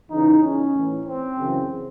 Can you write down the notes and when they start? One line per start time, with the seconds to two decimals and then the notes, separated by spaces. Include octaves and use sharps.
0.11 E2 C#3 E3 D#4
0.42 C#4
0.73 A2 E3
1.06 C4
1.37 F#2 C#3 E3